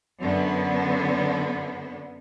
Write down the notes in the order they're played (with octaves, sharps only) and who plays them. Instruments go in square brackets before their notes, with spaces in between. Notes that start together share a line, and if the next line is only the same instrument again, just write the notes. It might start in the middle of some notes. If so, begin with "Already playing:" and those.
[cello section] F#2 D3 B3